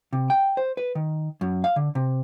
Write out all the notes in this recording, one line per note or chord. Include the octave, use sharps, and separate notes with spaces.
C3
G5
C5
B4
D#3
F#2
F5
D3
C3